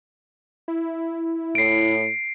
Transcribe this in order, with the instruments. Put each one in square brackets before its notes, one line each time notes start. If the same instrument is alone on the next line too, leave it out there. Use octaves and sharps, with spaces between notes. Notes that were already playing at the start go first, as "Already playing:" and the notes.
[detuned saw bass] E4
[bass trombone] A2 [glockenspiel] C7 D7